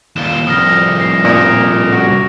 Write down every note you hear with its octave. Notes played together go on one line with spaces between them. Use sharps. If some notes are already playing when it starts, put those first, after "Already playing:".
D#2 F4 E7 G7
C2 F2 D#6 F6 A#6
A#6 C7
A#2 D#6 A#6 D7
F#4